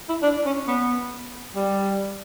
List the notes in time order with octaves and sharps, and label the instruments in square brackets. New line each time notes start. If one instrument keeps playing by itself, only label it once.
[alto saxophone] E4
D4
C#4
B3
G3